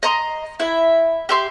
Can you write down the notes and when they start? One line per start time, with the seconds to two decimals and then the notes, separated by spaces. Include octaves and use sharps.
0.03 D#5 A#5 C6
0.60 E4 E5
1.29 G4 E5 C6